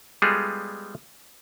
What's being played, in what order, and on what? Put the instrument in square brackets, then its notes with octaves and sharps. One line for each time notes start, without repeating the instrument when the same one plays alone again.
[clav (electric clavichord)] G3 G#3 B3 F4 G#4 A4